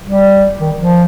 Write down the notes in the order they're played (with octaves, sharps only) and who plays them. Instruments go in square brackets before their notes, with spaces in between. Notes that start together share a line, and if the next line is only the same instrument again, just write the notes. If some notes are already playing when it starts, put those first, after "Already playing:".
[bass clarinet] G3
D#3
F3